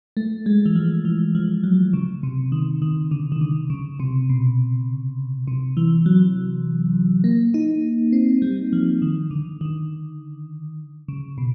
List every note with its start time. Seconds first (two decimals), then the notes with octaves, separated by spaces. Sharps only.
0.17 A3
0.46 G#3
0.66 E3
0.75 F3
1.05 E3
1.35 F3
1.63 F#3
1.93 C#3
2.23 C3
2.52 D#3
2.82 D#3
3.11 D3
3.32 D#3
3.41 D3
3.70 C#3
4.00 C3
4.29 B2
5.48 C3
5.77 E3
6.06 F#3
7.24 A#3
7.54 D#4
8.12 C4
8.42 G3
8.73 F3
9.02 D#3
9.31 D3
9.61 D#3
11.08 C#3
11.38 B2